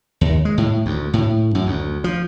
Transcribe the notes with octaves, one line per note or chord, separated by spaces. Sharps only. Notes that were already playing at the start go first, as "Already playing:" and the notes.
D#2
G#3
A2
D2
A2
F#2
D2
F3